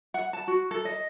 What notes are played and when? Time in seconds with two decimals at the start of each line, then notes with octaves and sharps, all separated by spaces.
0.14 F#5
0.33 A5
0.48 F#4
0.71 A4
0.85 D#5